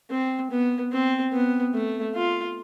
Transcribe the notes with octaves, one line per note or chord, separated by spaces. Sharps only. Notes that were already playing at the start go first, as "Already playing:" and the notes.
C4
B3
C4
B3
A3
F4